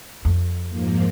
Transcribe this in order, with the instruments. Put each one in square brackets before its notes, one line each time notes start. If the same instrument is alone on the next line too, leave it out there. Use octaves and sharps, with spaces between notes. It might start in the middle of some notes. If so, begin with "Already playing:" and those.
[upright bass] F2
[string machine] G#2 F3 A#3